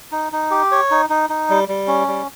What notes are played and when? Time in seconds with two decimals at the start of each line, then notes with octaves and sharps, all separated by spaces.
0.12 D#4
0.32 D#4
0.51 G4
0.71 C#5
0.91 D#4
1.10 D#4
1.30 D#4
1.50 G3
1.68 G3
1.88 C#4
2.08 G3